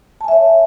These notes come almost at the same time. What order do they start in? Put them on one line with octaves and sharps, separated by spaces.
A5 G#5 E5 C#5